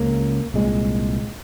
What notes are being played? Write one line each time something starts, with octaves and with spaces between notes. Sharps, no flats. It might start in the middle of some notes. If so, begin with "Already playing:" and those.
Already playing: C#2 C#3 A#3
C2 A#2 G#3